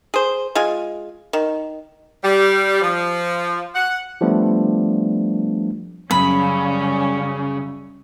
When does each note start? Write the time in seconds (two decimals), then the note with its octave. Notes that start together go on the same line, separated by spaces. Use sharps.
0.14 G#4 C5
0.55 G#3 F4 G#5
1.33 D#3
2.23 G3
2.82 F3
3.75 F#5
4.21 F3 G3 A3 B3 D4
6.11 F#2 C#3 G3 C#4 B5